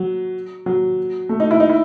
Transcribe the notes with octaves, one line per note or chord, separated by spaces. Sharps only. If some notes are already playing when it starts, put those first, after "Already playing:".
Already playing: F#3
F#3
A3
D#4
E4
D#4
E4